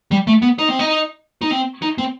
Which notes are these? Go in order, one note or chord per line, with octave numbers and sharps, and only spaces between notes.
G3
A3
B3
D#4
C4
D#4
D#4
C4
D#4
C4